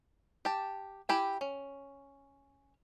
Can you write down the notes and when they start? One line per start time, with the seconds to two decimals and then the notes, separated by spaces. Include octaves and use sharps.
0.45 G4 A5
1.09 E4 G4 G#5
1.41 C#4